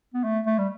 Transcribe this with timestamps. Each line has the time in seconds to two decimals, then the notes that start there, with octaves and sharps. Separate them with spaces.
0.14 B3
0.24 A3
0.46 A3
0.58 G3